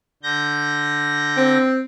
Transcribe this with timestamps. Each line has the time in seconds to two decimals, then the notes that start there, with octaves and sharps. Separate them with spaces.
0.23 D3 G6 A#6
1.37 C4